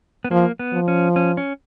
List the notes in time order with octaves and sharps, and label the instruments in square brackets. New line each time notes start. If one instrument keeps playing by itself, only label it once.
[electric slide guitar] B3
[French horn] F3 [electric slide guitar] A#3
[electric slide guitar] B3
[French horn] F3
[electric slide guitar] C#4
C#4
C#4